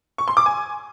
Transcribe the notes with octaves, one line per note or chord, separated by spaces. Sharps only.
C#6
C6
D6
G#5